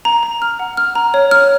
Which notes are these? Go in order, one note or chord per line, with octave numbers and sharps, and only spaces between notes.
A#5
A#5
F6
F#5
F6
A#5
C#5
F6